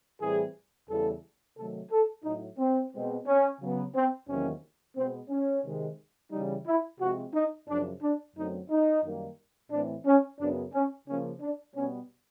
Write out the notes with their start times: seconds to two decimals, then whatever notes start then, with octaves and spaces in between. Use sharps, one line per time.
0.20 A2 E3 G3 C4 G#4
0.88 E2 C#3 E3 G3 B3 A4
1.57 C3 D#3 F#3 A3 A4
1.91 A4
2.24 A2 F#3 A3 D#4
2.58 C4
2.92 B2 G#3 C4
3.26 C#4
3.60 C#3 F#3 B3
3.95 C4
4.28 E2 C3 D#3 F#3 A#3 C#4
4.96 B2 G#3 B3 C4
5.30 C#4
5.64 C3 D#3 G#3
6.31 C#3 E3 G3 D#4
6.66 E4
7.00 C3 F3 G#3 C4 F#4
7.34 D#4
7.68 F#2 C#3 F3 D4
8.02 D4
8.36 F#2 D3 F#3 A3 C4 D#4
8.70 D#4
9.04 F#2 D#3 G3 A#3
9.71 A2 E3 A3 C4 D4
10.06 C#4
10.39 F#2 C#3 F#3 B3 D4
10.73 C#4
11.07 C#3 F3 A#3 C#4
11.41 D4
11.75 B2 G3 B3 C#4